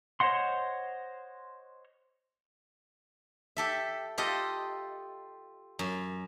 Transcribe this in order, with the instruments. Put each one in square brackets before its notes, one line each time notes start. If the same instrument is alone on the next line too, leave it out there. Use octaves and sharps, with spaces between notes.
[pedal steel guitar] C5 C#5 D#5 F#5 C6
[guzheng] G4 A4 E5
F4 G4 A4 D#5
F#2